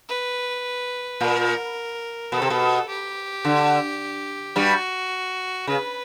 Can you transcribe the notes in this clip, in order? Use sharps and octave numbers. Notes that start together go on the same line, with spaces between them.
B4
A#2 A#4
B2 A4
C3
B2
G4
D3
G2 G3 F#4
C#3 B4